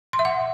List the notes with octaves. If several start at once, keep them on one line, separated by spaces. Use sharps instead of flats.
C6
E5
F#5